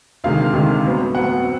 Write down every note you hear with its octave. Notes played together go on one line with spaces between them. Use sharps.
D2 C3 D#3 G#3 F5
D2 C3 D#3 G#3
A2 F#3 B3
A2 F#3 B3 F#5
C4